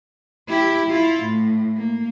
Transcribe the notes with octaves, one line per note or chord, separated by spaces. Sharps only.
E4 G4
E4 F4
A2
A#3